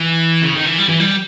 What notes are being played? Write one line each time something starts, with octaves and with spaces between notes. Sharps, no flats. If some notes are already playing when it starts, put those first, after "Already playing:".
Already playing: E3
C#3
D#3
E3
G3
E3
G3